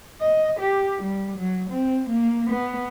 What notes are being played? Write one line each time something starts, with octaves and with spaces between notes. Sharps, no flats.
D#5
G4
G3
F#3
C4
A#3
B3